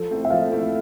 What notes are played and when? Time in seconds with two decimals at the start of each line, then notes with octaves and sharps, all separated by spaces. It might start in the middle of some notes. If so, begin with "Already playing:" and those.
Already playing: F3 A4
0.11 A3 C4 E4
0.25 E5
0.30 F3 F5
0.52 A3 C4 E4